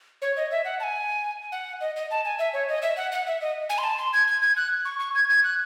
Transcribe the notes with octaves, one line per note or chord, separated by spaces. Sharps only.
C#5
D#5
E5
F#5
A5
G#5
F#5
D#5
D#5
A5
G#5
E5
C#5
D#5
E5
F#5
F#5
E5
D#5
G#5
C6
A5
C6
G#6
G#6
G#6
F#6
C#6
C#6
G#6
G#6
F#6